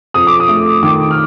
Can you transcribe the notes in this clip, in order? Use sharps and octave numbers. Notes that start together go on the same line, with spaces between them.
F2 D#6
D6
D#6
A3
D#3 D6
F6